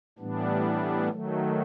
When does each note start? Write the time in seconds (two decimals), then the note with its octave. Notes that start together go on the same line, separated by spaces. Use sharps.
0.19 A2 E3 G3 B3 D4
1.10 D#3 F#3 A3